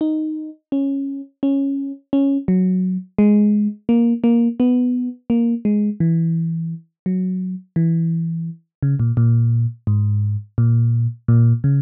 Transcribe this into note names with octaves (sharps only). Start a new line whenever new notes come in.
D#4
C#4
C#4
C#4
F#3
G#3
A#3
A#3
B3
A#3
G#3
E3
F#3
E3
C#3
A#2
A#2
G#2
A#2
A#2
C#3